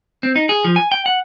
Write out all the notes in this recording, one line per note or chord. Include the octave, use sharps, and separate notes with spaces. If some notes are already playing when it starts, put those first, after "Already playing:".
C4
D#4
G#4
F3
G#5
G5
F#5